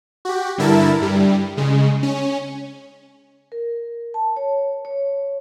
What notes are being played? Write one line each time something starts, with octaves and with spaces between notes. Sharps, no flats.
F#4 G4
G2 D3 E4 A#4 A5
G2 G3
C#3 G#3
C#4
A#4
A5
C#5
C#5